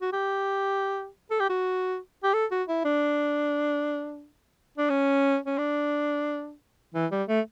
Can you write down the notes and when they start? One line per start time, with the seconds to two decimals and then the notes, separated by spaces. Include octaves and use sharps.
0.01 F#4
0.12 G4
1.30 A4
1.40 G4
1.49 F#4
2.24 G4
2.33 A4
2.51 F#4
2.68 E4
2.85 D4
4.78 D4
4.90 C#4
5.46 C#4
5.58 D4
6.94 E3
7.11 G3
7.28 A3